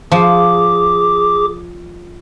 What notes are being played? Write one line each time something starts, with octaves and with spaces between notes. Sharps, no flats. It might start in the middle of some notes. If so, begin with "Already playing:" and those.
F3 G#4 D6